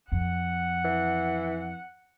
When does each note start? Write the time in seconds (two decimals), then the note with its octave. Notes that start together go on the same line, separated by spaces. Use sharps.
0.12 F2 F#5
0.84 E3